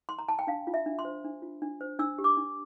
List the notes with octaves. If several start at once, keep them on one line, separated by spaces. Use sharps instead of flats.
C6
A#5
A5
G5
D4 F5
F4
E5
D4
C6
C5
D4
F4
D4
C5
D4 E6
G4
D6
D4